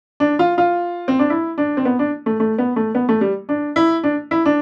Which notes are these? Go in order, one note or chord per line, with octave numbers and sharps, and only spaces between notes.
D4
F4
F4
C4
D4
E4
D4
C4
B3
D4
A3
A3
B3
A3
B3
A3
G3
D4
E4
D4
E4
D4